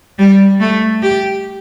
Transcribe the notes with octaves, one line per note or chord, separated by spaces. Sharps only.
G3
A3
G4